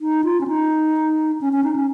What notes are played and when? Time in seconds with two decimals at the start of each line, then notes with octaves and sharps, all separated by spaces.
0.01 D#4
0.24 F4
0.41 C#4
0.48 D#4
1.41 C#4
1.53 C#4
1.64 D#4
1.76 C#4